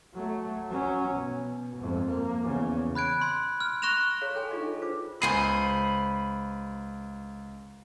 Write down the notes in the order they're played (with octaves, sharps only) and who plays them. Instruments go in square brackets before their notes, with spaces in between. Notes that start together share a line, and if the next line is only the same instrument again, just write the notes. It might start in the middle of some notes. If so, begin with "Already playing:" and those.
[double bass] F#3 A3
F#3 C#4
B2
F2 G#2
A#3
E2 C#3
[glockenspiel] B5 F#6 G#6 D7
C6
F6
C#6 F#6 A#6 E7 F7
[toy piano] G#4 C#5 F5 A#5 C6
G#4 A4 G5 G#5
D4 D#4 F4 G#4 D#5 C#6
A4
D4 F4 B4 C5 D6
[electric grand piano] C#2 C7 D#7 [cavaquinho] C5 G#5 D#6 [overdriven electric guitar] B5